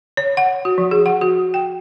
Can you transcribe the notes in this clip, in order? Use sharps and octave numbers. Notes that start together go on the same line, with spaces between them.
C#5
F#5
F#4
F3
G#4
F#5
F#4
G5